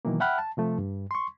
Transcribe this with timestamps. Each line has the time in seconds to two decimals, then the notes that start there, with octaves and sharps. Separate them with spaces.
0.05 B2 D#3 E3 F#3 A#3
0.20 E5 F#5 G5 B5 F6 F#6
0.38 A5
0.57 C3 F3 A3
0.78 G2
1.11 C6 C#6